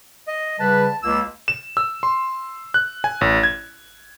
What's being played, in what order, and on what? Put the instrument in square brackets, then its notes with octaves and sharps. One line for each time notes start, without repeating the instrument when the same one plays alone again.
[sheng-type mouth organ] D#5
[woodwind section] C#3 G3 B4 [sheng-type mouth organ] A5
[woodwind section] C#2 A#3 [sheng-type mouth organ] E6
[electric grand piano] E7
E6
C6
F#6
G#5
A1
G#6